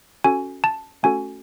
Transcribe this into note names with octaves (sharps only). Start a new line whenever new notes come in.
C#4 F#4 A4 G#5
A5
A3 C#4 F#4 A4 G#5